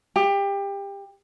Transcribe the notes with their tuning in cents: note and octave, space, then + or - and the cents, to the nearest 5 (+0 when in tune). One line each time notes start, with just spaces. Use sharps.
G4 +25